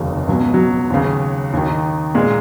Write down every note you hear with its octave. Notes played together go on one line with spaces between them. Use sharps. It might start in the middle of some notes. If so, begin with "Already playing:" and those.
Already playing: F1 D#2 C#3 F#3 A#3
C#2 B2 F#3
F#3
D#2 C#3
D#2 D#3
A#2 G#3